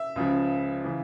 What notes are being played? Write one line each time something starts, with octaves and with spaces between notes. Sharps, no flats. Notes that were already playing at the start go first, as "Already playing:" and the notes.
Already playing: E5
C#2 C#3 F3
C#3 E3